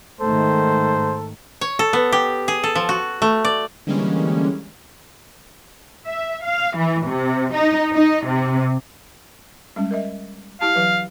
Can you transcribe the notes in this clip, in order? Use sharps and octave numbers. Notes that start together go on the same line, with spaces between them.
G#2 D#3 A3 A4 C5
C#5
A4
B3
G4
G#4
A4
F3
F#4
A3
D5
D3 E3 G3 G#3 A#3 C#4
E5
F5
E3
C3
D#4
D#4
C3
G3 G#3 C#4
A#4 D#5 E5
E4 G4 F5 A5
E3 F#3 B4